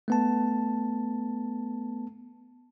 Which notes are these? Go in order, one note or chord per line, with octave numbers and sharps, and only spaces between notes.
A3 B3 A5